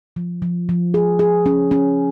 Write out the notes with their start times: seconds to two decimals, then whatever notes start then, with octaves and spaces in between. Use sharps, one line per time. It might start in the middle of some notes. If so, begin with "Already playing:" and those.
0.16 F3
0.42 F3
0.69 F3
0.94 G#4
1.19 G#4
1.46 C#4
1.71 C#4